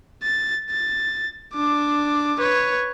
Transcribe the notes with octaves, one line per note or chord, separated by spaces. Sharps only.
A6
A6
D4 D6
B4 C#5